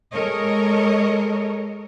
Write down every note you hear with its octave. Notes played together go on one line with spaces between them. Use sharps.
G#3 A4 A#4 C#5 D#5